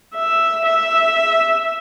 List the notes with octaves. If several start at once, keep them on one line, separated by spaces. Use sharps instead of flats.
E5
E5